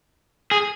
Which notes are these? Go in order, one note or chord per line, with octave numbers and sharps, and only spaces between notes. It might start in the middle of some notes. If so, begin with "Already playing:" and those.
G#4